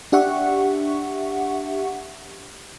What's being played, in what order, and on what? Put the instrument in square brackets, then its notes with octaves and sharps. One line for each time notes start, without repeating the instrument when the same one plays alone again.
[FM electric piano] D4 G4 E5 F#5 C#6